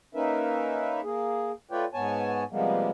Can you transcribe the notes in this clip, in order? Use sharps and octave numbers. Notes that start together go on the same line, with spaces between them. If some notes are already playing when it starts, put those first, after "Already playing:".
A#3 C#4 D#4 A#4 B4 E5
A#3 G#4
A3 F4 B4 C#5 D5 G5
G#2 B3 C#5 G#5 A5
C3 F3 G3 G#3 A#3 B3